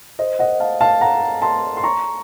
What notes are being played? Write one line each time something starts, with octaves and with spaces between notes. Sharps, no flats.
C5 D#5
D#5 F#5
F5 A5
F5 A5
F#5 A#5
A5 C6
C6
A#5 C#6